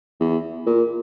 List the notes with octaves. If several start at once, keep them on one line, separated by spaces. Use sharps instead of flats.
E2
A#2